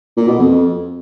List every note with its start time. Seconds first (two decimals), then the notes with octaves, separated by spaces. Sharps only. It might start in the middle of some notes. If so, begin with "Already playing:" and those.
0.17 A#2
0.28 B2
0.39 F2